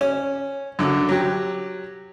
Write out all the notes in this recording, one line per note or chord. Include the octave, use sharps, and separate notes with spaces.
C#4
F#2 D3
F#3 G4